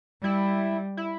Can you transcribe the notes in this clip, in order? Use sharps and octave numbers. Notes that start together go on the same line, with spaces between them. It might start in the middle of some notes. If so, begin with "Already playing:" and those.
G3 E4
E4